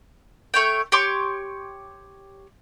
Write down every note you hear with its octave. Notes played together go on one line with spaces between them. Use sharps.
A3 C#5 G5
G4 C#5 C6 D6